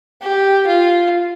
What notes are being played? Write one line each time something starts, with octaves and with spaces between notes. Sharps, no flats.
G4
F4